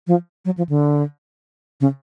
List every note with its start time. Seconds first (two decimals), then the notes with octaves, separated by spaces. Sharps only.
0.07 F3
0.45 F#3
0.58 F3
0.69 D3
1.81 C#3